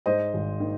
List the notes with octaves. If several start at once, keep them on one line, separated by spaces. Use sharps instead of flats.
G#2 C5 D#5
G#1
D#3